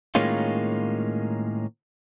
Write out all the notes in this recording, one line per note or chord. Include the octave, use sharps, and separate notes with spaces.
A2 D#3 G#3 A#3 C#4 F4